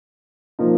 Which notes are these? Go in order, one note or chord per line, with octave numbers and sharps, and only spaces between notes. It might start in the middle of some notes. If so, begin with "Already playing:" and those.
F3 A#3 D#4